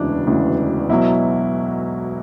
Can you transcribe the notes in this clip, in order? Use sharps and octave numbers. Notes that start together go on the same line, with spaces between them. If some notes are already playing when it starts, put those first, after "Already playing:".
Already playing: E1 D2 C#3 E3 D4
E1 D2 C#3 E3
B1 B2 F#3 E4